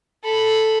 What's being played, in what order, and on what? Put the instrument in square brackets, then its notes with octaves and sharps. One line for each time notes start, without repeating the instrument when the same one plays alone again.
[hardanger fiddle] A4 B5